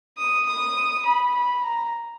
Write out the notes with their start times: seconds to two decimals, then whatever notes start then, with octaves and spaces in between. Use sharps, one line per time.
0.18 D#6
0.46 D#6
1.05 B5
1.34 B5
1.63 A#5